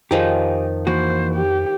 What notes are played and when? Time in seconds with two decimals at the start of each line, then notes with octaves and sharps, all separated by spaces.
0.11 F2 D#3 F3 D#4 G4 G#4
0.87 E3 A#3 F#4 C5
1.35 G4